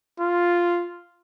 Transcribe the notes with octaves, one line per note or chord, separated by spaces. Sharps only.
F4